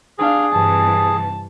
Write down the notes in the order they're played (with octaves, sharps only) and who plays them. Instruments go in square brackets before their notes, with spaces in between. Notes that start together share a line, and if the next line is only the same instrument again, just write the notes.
[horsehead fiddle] D4 F5 [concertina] G#4
[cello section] G2 C3 E3 [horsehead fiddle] A5